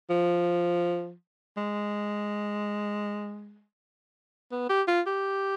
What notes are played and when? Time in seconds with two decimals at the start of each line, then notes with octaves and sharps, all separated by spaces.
0.10 F3
1.57 G#3
4.51 B3
4.69 G4
4.88 F4
5.07 G4